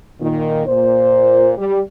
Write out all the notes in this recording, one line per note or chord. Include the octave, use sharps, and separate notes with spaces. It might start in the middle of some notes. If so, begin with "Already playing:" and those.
A#2 D#3
A#2 C5
G3